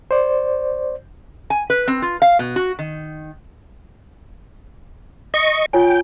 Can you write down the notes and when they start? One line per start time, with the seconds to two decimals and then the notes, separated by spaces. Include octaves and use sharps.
0.11 C5 D5
1.50 G#5
1.70 B4
1.88 C4
2.02 F4
2.22 F5
2.39 B2
2.56 F#4
2.79 D#3
5.34 D#5 C#6
5.73 F4 C#5 G5 G#5